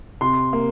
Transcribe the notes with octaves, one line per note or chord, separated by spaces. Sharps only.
C3 C6
A#3